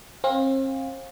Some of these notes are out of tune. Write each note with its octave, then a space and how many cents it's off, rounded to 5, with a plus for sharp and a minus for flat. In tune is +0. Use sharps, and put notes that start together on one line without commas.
C4 +40 F5 +20